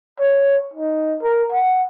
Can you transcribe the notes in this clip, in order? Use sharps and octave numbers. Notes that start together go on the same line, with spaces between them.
C#5
D#4
A#4
F#5